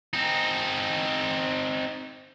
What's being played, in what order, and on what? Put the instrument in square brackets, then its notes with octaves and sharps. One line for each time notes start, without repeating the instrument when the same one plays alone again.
[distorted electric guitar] C4 D#4